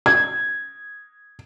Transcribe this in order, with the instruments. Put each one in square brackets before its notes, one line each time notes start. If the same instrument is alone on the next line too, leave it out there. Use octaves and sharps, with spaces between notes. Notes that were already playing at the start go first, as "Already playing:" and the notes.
[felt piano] G#6